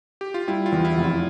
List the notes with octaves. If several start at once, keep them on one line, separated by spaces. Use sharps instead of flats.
G4
F4
G3 E4
F4
E2
E4
F1
F4